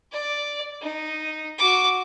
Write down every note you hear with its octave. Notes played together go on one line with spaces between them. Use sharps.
D5
D#4
F#4 D6